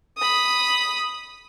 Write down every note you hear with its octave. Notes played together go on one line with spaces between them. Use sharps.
B5 D#6